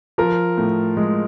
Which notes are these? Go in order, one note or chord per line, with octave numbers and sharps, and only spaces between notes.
F3 A#4
A2
G#3